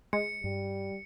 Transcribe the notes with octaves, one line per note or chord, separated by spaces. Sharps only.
G#3 C#7
G2 G3